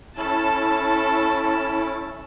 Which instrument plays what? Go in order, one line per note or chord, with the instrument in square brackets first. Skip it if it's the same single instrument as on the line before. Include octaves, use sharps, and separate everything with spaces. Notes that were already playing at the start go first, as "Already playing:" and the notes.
[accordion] C#4 E4 [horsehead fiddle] A4 [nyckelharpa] A5